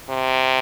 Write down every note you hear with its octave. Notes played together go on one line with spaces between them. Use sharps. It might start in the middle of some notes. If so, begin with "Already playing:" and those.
C3